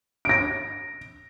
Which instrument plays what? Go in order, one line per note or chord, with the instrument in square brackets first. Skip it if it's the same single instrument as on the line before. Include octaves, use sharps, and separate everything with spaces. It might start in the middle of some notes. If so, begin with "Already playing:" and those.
[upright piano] A#6 D7